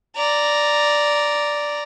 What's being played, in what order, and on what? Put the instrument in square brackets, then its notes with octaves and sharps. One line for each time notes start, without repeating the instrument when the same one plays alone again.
[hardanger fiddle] D5 A#5